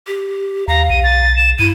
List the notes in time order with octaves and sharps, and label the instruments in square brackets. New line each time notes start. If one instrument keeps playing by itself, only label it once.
[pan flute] G4
[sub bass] D#2 [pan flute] F5 [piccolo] A#5
[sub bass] B1 [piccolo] D#7
[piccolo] A6
E7
[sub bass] G2 [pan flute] E4 [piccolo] D#7